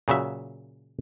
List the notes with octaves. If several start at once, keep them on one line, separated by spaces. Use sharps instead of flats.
A#2 C#3 F#3 E5